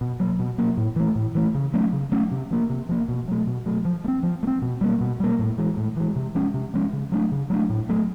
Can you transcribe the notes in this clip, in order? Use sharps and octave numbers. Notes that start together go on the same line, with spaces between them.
B2
F#3 A#3
B2
F#3 A#3
A2
E3 A3
A2
E3 A3
C#3
F#3 A3 C#4
C#3
F#3 A3 C#4
C3
F3 A#3
C3
F3 A#3
B2
F#3 A3
B2
F#3 A3
F3
A3
C4
F3
A3
C4
B2
G3 A#3
B2
G3 A#3
A2
E3 G#3
A2
E3 G#3
C3
F3 G#3 C#4
C3
F3 G#3 C#4
C#3
F#3 A3 D4
C#3
F#3 A3 D4
A2
F#3 A3